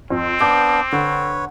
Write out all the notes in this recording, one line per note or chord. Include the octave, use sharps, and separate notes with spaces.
F2 C4
B3 D4 D6 G6
D3 B4 C#5